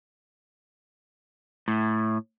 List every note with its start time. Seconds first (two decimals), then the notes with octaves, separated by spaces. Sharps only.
1.68 A2